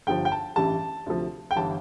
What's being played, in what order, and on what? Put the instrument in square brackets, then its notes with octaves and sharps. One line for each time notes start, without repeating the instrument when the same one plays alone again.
[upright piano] G1 G2 F3 G5
G5
A5
A1 G2 E3 G3 A5
D2 C3 F3
G5
G1 E3 G3 A5